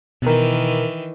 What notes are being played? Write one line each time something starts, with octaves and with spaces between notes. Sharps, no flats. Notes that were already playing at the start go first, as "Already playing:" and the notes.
B2 D#3 E3 A#4